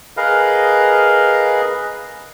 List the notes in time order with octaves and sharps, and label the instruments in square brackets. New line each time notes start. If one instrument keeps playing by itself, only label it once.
[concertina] G#4 A#4 B4 D#5 F5